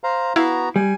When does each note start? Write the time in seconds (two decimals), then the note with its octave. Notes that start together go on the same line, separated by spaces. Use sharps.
0.04 C5 F5 A#5
0.36 B3 E4 F#4 F5 A#5
0.76 G3 G#5